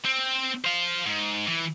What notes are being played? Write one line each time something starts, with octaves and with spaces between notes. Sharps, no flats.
C4
C5 F5
G#2
E3